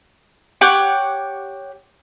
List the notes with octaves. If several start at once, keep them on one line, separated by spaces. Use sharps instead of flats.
G4 C#5 F#5 D6